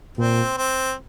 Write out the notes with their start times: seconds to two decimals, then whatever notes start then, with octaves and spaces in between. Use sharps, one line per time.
0.17 A#2 C4
0.57 C4